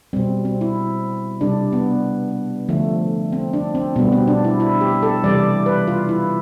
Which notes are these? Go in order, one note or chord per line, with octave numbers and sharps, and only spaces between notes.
B2 G3 C4
C4
E4
C3 G3 D4
B3
D3 F3 A3
C4
D4
C4
B2 G3 B3
C4
D4
E4
E4
G4
A4
C3 E3 G3 D5
B4
F4
E4